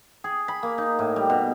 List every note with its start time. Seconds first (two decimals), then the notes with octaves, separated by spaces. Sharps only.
0.24 G#4
0.48 B5
0.63 A#3
0.78 D#4
0.99 A2
1.16 G3
1.30 B2